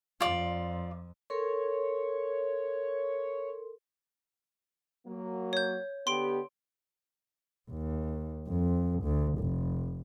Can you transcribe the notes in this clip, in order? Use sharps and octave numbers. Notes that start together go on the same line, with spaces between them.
F2 F4 D5
A4 A#4 C#5 C6
F#3 A#3
C#5 G6
D3 B3 G4 C6 D7
D#2
F2
D2
F1